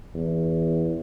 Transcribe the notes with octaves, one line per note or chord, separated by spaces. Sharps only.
E2